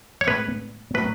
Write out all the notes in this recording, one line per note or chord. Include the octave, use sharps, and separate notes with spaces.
C#5
A2 G#3 B4
A2 F#3 B4